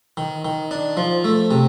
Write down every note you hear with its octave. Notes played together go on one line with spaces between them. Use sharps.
D#3
D#3
D4
F3
A3
C3